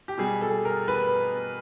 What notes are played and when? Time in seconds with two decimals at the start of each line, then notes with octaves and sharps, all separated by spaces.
0.08 G4
0.18 B2 G3 G#4
0.41 A4
0.65 A#4
0.88 B4